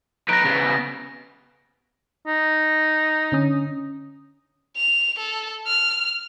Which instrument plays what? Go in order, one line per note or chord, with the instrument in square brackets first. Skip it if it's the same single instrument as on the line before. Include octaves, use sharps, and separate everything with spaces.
[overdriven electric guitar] D#4 B4 [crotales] A#6 D7
[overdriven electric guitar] C#3 B3
[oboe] D#4
[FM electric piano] D3 C#4 D#6
[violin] F7
A4
F6